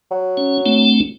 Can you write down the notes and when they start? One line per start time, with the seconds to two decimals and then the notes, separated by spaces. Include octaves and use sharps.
0.11 F#3
0.37 C#4
0.66 A3 C4 D4